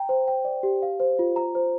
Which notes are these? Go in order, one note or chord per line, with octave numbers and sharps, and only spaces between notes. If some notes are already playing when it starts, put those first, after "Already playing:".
Already playing: G5 A#5
C5
G5
D5
G4
F5
C5
F4
A#5
C5